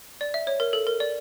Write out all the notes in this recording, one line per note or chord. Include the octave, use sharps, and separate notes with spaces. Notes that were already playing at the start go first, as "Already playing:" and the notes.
D5
E5
C#5
A#4
A4
A#4
D5